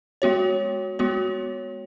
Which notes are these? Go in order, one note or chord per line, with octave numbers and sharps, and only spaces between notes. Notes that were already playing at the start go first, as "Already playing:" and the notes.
G#3 B3 F#4 C#5
G#3 B3 F#4 C#5